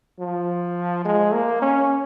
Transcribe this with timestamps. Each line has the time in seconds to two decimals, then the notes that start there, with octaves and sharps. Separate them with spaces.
0.19 F3
1.05 G#3
1.34 A#3
1.62 C#4